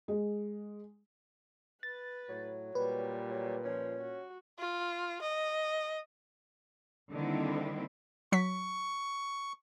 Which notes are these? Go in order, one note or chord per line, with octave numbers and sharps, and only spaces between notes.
G#3
B4 A6
A2 F#3
A#2 G3 B4
F#3
F3 C#4
F#4
F4
D#5
D3 D#3 G3 A#3 C4 E4
F#3 C#6 B6